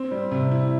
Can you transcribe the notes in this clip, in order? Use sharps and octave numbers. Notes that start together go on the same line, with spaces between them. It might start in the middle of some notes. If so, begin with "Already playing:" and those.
Already playing: C4
G3
C3
E4